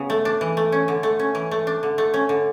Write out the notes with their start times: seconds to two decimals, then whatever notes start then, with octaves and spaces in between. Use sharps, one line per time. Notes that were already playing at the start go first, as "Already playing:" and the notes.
Already playing: C#3 B3
0.10 A3
0.25 D4
0.41 E3
0.57 A3
0.72 C#4
0.88 D3
1.03 A3
1.19 C#4
1.35 E3
1.51 A3
1.67 D4
1.83 D3
1.98 A3
2.14 C#4
2.29 D3